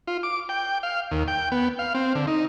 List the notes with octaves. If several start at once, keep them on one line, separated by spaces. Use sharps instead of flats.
F4
D6
G5
F5
D#2
G5
B3
F5
C4
D3
D#4